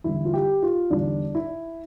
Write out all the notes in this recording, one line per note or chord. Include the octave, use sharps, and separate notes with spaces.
E2 D3 G3 E4
F4
G4
F4
E2 D3 G3 D4
E4